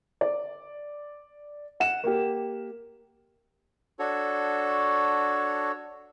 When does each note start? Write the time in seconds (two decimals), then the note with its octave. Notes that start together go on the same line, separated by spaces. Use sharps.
0.21 D5
1.80 F#5 E7
2.04 A#3 G4
3.99 D4 F#4 A4 C#5